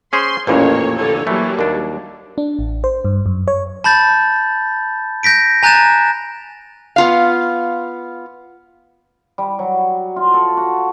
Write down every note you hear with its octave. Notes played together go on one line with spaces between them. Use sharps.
C#4 G#4 C5 C6
A1 F2 A#2 A#3 C#4 E4 B4 C#5
D3 A4 C#5
E3 F#3 G3 A3 A#3
D#2 D4 A#4
D4
A1
C5
G2
F#2
C#5
A5 B5 G6 A6
G6 A#6 B6 D7
G#5 A#5 F#6 G6 A6 E7
B3 F4 F5
G3
F#3
F4
A4
F#4